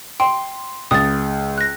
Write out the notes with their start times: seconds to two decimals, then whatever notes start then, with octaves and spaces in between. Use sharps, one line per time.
0.20 G5 C6
0.91 C#2 D#6 A6
1.58 F#6 A#6